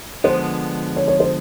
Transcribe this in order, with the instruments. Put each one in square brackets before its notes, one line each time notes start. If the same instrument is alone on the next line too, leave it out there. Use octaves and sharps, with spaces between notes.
[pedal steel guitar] D3 F3 G#3 B3 [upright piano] C5
[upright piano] C#5
C#5
C5